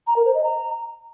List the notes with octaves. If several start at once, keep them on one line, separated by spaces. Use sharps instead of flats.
A#5
A#4
C5
D#5
A#5